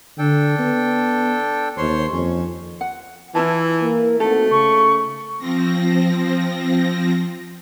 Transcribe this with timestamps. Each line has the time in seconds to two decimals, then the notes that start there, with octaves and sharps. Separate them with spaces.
0.19 D3 D4 A4 G5
0.59 B3
1.77 D#2 C5 C#5 C6
2.12 F2 C#4
2.81 F#5
3.35 E3 E4 F4 A5
3.82 A#3 A#4
4.20 D#3 A3 C4 F#4 A4
4.51 C#3 C#6
5.39 F3 C4 A#6